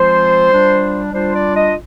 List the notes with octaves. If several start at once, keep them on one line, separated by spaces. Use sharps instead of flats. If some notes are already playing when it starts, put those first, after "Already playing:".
Already playing: F3 G#3 C4 F4 C5
G3 D4 F4
G3 D4 F4 C5
D5
D#5